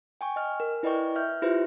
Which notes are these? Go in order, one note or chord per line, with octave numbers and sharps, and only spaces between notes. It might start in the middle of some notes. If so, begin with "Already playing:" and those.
G5 G#5 C#6
D#5 F6
A#4
E4 B4 D5 D#5 G5 C#6
E5 F6 G6
E4 F4 G4 B4 C5 E5